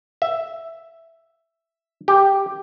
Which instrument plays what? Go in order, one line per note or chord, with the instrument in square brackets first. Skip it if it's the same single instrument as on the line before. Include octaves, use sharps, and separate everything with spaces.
[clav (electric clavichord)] E5
G4